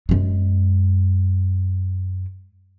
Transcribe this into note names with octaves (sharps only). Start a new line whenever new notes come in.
F#2 G#3